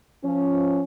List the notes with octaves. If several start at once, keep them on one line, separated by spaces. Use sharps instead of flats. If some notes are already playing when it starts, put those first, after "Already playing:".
F3 C#4